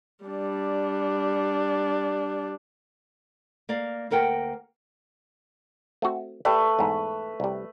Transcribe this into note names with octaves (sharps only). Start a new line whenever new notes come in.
G3 D4
A#3 D5 F5
D2 A#3 A#4 F#5 G5
A3 C4 F#4
A3 G4 B4 D5
E2 G#2
C2 G3